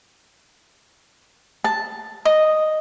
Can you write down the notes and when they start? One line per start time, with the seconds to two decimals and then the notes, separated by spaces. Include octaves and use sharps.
1.64 A5
2.25 D#5